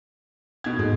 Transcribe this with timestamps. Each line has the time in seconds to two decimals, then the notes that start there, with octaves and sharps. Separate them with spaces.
0.64 B2 G#6
0.79 G#2 G#3